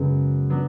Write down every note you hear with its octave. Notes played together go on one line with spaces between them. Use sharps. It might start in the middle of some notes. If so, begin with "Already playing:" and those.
Already playing: F#2 C#3 G#3 B3
F#3 B3 D4